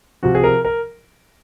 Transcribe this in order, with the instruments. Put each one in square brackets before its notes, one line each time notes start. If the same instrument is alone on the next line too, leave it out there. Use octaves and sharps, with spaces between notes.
[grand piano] C3 F3 F#4
G#4
A#4
A#4